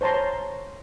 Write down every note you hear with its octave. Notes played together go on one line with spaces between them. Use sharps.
C5 C#5 A5 A#5 C6